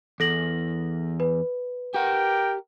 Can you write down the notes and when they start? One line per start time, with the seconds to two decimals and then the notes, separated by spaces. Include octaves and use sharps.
0.20 E2 A4 A#6 F#7
1.20 B4
1.94 G4 A#4 F#5 G5